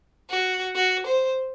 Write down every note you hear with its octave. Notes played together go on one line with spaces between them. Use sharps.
F#4
F#4
C5